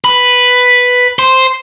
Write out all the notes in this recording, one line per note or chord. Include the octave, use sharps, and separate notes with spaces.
B4
C5